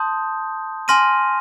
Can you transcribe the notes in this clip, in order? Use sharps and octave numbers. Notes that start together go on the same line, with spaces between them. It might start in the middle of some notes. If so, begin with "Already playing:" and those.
Already playing: A5 C6 D#6 G6
G#5 C6 F6 A#6 D#7